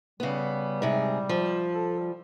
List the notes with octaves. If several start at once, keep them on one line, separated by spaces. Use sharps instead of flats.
C#3 G3 B3
G#2 C3 G#4
F3
A4
G3